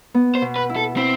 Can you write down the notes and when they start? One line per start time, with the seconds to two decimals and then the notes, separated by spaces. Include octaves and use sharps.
0.14 B3
0.35 C5
0.42 B2
0.56 B4
0.69 E4
0.76 A4
0.97 C4 E4